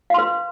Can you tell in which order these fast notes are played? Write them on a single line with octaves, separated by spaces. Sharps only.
F5 C6 B4